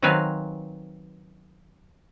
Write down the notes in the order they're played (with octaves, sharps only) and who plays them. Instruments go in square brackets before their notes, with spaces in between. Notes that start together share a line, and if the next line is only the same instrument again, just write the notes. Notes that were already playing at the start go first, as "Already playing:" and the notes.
[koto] D#3 F#3 C4 B4 F5 G#5